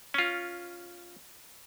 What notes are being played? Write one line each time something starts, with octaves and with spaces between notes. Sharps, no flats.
C#4 F4